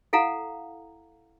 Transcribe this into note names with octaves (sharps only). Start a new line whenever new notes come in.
E4 A4 F5 F#5 A#5